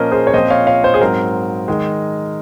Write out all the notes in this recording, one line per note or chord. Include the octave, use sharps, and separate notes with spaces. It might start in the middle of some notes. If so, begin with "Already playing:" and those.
Already playing: A#2 F3 A#3 C#4 A#4 C5 D#5
G#4 C5
C#5
A#2 F3 C4 C5 D#5
C#5 F5
C#5 F5
C5 D#5
G#4
G#2 F#3 C4 A#4
D#3 G#3